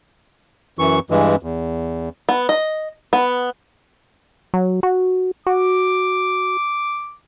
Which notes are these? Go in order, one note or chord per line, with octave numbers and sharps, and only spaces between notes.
F#2 E3 C#6
G2 E3 G#3
E2
B3
D#5
B3
F#3
F#4
F#4 D6